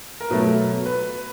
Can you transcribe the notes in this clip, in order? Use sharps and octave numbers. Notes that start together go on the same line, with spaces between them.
A#4
B2 F#3 A3 B4
B4